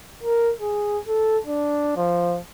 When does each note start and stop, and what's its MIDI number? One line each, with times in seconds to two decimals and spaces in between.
0.23 0.52 70
0.61 0.98 68
1.07 1.38 69
1.47 1.92 62
1.96 2.39 53